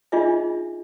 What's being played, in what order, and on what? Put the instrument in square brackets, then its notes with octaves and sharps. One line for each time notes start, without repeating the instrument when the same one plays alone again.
[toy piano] D4 D#4 F4 G#4 D#5 E5